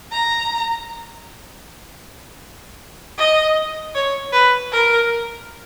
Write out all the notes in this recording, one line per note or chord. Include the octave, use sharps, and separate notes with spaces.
A#5
D#5
C#5
B4
A#4